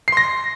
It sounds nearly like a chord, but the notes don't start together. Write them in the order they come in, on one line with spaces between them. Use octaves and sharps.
C7 C6 A#6